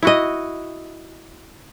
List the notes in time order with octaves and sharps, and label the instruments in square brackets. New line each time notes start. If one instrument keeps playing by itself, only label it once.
[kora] E4 F#4 D#5